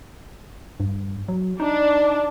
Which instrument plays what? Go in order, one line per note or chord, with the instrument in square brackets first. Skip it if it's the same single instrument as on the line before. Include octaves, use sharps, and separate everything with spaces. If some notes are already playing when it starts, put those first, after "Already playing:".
[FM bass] G2
F#3
[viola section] D4 [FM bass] D#4